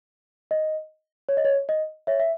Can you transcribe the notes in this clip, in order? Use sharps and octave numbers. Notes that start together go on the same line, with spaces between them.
D#5
C#5
D#5
C#5
D#5
C#5 E5
E5